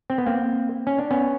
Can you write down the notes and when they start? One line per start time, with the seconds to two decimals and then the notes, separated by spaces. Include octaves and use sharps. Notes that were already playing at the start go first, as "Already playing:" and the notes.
0.10 C4
0.18 B3
0.26 A#3 C4
0.87 C#4
0.98 D4
1.11 B3 C#4